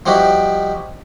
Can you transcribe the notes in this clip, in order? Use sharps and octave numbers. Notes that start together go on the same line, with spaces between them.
F3 G3 D#4 E4 F#4 G4